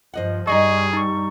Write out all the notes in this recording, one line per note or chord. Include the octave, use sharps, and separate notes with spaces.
G2 F3 C5 D#5 F#5
G2 G3 D#4 G#4 D5 D#5 C#6
D#4 A5 C#6